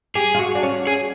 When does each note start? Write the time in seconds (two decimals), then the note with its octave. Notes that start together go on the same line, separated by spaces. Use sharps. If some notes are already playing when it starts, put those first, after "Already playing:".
0.15 G4 G#4
0.34 F4
0.39 F#4
0.55 D4
0.63 C#4
0.87 G#4